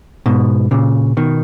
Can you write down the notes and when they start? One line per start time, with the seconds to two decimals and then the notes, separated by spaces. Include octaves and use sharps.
0.26 G#2 B2
0.71 A#2 C#3
1.17 B2 D#3